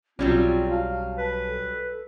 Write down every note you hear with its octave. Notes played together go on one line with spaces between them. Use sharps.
B1 F#3 G3 C4 C#4 F4
F5 A5
B4
A4